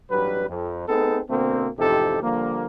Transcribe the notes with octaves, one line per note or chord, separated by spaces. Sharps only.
A1 G2 F#3 G3 B4
F2
A3 B3 C4 D#4 G#4 A4
B2 D3 A#3 C4
A1 F2 C3 D#4 G4 A4
D3 F3 G3 A#3